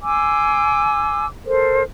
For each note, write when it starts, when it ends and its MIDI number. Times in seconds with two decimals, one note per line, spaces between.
0.02 1.27 80
0.02 1.27 84
0.02 1.27 86
0.02 1.27 88
1.44 1.83 69
1.44 1.83 70
1.44 1.83 72